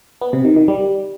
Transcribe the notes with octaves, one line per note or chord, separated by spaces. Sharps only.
B3
C3
D#3
D#3
G3